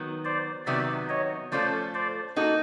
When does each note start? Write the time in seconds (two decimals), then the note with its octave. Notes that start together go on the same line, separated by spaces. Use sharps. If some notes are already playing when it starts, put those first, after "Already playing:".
Already playing: D#3 F#3 B3
0.25 C5 D5
0.66 C3 D#3 F#3 B3 D5 E5
1.09 C#5 D#5
1.52 F3 A3 C#4 F4 A4 C5 D5
1.94 C5 D5
2.36 A#3 D#4 F#4 A4